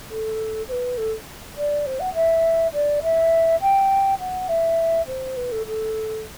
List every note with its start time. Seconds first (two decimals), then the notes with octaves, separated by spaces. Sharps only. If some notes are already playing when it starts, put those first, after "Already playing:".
0.09 A4
0.68 C5
0.72 B4
0.98 A4
1.57 D5
1.86 C5
2.00 F#5
2.14 E5
2.73 D5
3.03 E5
3.61 G5
4.19 F#5
4.49 E5
5.07 C5
5.36 B4
5.52 A4
5.66 A4